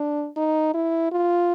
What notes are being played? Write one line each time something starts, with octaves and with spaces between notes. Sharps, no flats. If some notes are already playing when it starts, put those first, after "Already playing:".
Already playing: D4
D#4
E4
F4